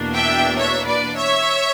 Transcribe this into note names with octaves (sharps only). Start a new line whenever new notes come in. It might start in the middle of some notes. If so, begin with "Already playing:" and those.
Already playing: E2 B2 A#3 D4
E5 G5
C#5 E5
B4 D5
C#5 E5